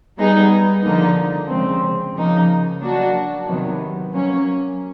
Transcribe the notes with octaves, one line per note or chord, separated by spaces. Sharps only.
G3 B3 D#4 G#4
D3 F3 A#3 D#4
C#3 F3 G#3 C4
C#3 F3 A#3 D#4
F#3 A#3 D4 F#4
C3 D#3 F#3 B3
F#3 A#3 C#4